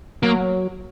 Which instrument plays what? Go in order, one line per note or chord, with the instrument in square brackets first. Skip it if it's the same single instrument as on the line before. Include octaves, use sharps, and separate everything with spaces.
[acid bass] F#3 [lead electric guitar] A#3